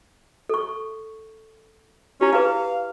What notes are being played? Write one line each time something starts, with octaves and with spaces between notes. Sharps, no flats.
A4 C#6
C#4 E4 G4
E4 G#4 B4 F5